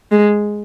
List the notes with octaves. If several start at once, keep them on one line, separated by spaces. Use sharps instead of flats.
G#3